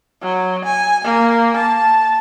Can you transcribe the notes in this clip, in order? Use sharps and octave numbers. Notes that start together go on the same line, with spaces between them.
F#3
G#5
A#3
A5